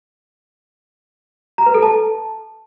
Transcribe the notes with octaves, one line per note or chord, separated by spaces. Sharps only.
A#5
B4
A4
A5